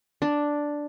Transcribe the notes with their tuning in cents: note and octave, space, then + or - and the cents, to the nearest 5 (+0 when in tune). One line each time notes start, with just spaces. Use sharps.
D4 +0